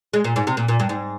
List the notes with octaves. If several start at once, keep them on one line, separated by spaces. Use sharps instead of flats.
G#3
A#2
G#2
C3
A#2
A#2
G2
G#2